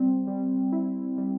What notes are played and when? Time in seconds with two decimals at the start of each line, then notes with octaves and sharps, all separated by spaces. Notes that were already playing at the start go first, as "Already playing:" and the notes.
Already playing: G3 C4
0.27 G3
0.72 E4
1.18 G3